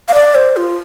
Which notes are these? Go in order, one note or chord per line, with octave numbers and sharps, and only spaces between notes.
F5
D5
C5
F4